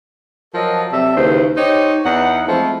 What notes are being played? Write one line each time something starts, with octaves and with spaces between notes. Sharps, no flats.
F3 F#3 A4 A#4 D#5
C3 F#3 A4 D5 E5
D#2 C#3 E3 C5
D#4 G4 C5 C#5
E2 B3 D#4 F#5
F3 G#3 A3 C4 E4